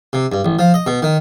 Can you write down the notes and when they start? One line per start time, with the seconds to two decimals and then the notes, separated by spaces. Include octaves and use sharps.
0.13 C3
0.32 G2
0.45 A1
0.59 F3
0.74 D#5
0.87 B2
1.02 D#3